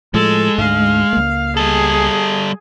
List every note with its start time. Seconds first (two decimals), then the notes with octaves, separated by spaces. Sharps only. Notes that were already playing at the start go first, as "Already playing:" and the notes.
0.14 A2 F3 G#3 A4
0.58 D2 G#2 F5
1.13 C#2 A#3
1.57 G3 G#4 A4